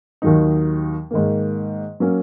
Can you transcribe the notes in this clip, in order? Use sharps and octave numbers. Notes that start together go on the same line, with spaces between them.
D#2 D#3 F#3 D#4
G#2 D#3 A#3
F#3 A#3 C#4